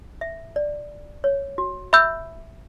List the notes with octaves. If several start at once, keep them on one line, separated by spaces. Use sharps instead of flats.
E5
D5
C#5
F#4
E5 B5 E6 G6